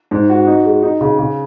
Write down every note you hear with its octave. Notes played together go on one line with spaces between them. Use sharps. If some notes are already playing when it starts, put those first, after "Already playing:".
G#2
F#4
D#4
G#3
D#4
C#3
C#3